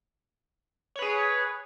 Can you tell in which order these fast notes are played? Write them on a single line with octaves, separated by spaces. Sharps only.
C#5 B4 G#4